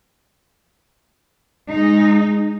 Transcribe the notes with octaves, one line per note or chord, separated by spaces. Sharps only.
G#3 D#4